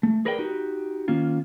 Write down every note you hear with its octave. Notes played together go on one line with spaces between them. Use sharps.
A3
G#4 A#4 B4 D5 F5 G5
D#4 F#4 G4
D#3 A#3 C#4 F4